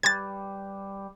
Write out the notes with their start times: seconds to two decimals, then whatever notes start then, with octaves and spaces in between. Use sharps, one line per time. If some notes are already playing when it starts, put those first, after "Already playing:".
0.03 G3 G4 B4 G#6 A6